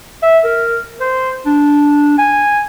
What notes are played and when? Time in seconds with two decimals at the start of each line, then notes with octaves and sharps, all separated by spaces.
0.23 E5
0.44 A#4
1.01 C5
1.46 D4
2.18 G#5